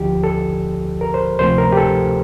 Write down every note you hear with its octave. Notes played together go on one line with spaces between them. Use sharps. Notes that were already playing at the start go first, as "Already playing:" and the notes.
Already playing: D2 D3 F3 G4
A4
A#4
C5
D2 C3 F3 A3 C5
A#4
G4
A4